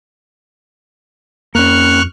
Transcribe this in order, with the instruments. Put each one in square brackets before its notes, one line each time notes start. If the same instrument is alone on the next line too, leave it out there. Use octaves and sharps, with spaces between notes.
[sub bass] F2 [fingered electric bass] A#3 C#4 [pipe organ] C#6 F6 F#6